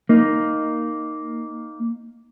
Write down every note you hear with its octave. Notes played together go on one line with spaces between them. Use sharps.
A#3 D#4